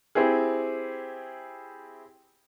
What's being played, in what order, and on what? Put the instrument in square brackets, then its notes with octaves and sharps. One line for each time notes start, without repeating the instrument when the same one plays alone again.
[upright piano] C4 E4 G4 G#4